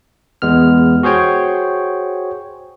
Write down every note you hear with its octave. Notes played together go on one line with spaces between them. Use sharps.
E2 G#3 B3 F6
F#4 G#4 C5 C#5 G5